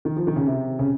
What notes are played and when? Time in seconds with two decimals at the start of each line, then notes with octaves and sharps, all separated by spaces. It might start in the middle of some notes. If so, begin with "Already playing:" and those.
0.05 D#3
0.16 F3
0.27 D#3
0.36 C#3
0.47 C3
0.79 C#3